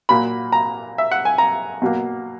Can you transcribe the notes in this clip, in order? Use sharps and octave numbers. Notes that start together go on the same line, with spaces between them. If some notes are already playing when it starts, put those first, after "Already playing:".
A#2 F#3 A#3 B5
A#5
E5
F#5
G#5
A#5
B2 F#3 A#3